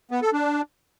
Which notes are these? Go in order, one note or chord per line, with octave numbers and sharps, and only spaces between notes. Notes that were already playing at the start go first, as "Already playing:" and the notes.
B3
A4
D4